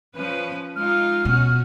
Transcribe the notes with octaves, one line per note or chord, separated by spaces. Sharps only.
F3 C#4 B4
G#3 D#4 F4 F6
B2 C#4 F#4